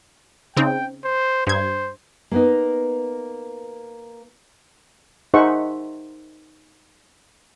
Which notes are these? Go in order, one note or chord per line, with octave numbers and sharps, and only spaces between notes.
C#3 C4 D#4 G5
C5
G2 C5 G#6
A#3 B3 D#4
D#4 G#4 C5 E5 F#5 C#6